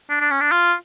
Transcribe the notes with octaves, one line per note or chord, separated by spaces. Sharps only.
D4
D4
C#4
D4
F4